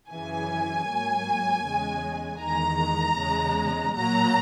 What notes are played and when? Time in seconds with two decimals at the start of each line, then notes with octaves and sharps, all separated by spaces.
0.10 F#2 C#3 E3 G#5
0.88 G#2 F#3 A#3
1.65 E2 C#3 G#3
2.41 E2 D#3 G#3 A#5
3.19 E2 C#3 G#3
3.95 A#2 F#3 A#3 A#5